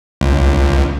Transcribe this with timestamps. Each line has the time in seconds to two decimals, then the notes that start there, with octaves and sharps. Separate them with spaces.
0.21 C#2